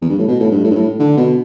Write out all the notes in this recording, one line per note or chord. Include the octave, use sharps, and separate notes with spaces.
E2
G2
A2
B2
A2
G2
A2
G2
A2
D3
B2